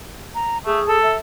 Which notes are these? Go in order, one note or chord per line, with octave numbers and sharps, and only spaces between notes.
A#5
A3 G#4
A4
E5